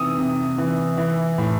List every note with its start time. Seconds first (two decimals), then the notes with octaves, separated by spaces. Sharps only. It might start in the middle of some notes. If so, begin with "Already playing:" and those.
Already playing: C3 E3 D#6 E6
0.19 C3
0.58 E3
0.98 E3
1.38 A2